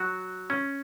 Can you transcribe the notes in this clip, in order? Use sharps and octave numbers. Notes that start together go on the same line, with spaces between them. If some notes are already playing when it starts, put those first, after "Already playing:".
Already playing: F#3 F#4
C#4